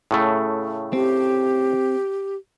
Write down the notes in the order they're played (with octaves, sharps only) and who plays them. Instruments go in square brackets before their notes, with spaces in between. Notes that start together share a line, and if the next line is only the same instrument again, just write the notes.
[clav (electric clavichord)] A2 C#3 A3
[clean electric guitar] C4 [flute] G4